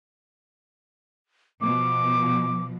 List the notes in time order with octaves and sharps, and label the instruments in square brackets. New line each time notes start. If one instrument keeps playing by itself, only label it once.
[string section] B2 F3 [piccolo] D6